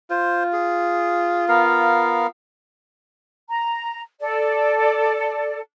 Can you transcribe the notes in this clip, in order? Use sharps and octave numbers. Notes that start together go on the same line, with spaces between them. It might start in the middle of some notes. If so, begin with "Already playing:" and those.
F4 C5
G#4
B3 A#4 F5
A#5
A4 D5